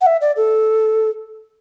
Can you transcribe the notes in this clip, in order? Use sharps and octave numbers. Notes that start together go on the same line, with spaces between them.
F#5
E5
D5
A4